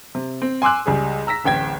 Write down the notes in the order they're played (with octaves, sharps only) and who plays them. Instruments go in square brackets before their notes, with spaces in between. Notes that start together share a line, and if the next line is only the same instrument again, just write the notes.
[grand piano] C3
C4
G#5 C6 D6 E6 F#6
C#2 G3 G#4
A#5 E6 A#6 B6
D1 A1 G5 G#6